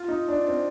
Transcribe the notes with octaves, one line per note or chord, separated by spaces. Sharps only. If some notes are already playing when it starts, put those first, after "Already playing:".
Already playing: F4
D#4
D4
C4